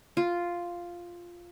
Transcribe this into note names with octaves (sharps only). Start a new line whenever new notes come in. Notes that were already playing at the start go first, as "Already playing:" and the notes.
F4